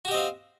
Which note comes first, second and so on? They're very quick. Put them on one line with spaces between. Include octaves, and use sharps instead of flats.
F#4 G4 D#5 C4 F5